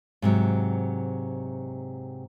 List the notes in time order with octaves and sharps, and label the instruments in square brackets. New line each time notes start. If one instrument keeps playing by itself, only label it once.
[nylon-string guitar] G#2 C3 F#3